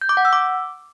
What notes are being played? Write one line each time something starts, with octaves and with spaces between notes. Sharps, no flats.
G6
D6
F#5
E6
D6